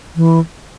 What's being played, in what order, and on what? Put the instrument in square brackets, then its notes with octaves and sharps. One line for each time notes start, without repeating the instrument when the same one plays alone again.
[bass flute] E3